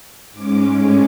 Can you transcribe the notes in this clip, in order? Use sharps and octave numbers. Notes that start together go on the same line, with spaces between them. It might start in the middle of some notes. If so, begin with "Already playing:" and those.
G#2 G#3 C#4 D6
A2 G#3 C#4